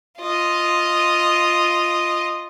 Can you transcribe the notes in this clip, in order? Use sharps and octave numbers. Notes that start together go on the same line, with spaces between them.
F4 D#5